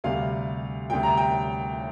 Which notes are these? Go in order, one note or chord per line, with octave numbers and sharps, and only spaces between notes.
D2 C3 G3 F5
D2 C3 G3 G5
A#5
G5